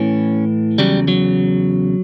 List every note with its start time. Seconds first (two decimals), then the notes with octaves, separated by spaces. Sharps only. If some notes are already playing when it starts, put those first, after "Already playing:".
Already playing: A2 E3 C#4
0.78 E2 C#3 F#3 G3
1.08 F#3